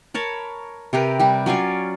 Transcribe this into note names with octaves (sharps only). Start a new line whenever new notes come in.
A#4 C#5 A5 B5
C3 G4 A#4 B4
G3 G4
F#3 C#4 F4 D5